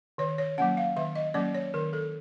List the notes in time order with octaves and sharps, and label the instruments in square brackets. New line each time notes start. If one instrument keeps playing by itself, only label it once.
[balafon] D#3 C#5
C#5
F#3 A#3 C#4 F#5
F5
D#3 E5
D#5
F#3 A#3 C#4 D5
C#5
D#3 A#4
A4